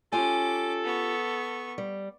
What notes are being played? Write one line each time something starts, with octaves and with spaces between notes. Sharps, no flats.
C#4 F4 G4 A4 G#5 D6
B3 C#6
G3